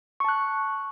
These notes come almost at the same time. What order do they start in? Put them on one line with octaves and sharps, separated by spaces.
C#6 A5 F#6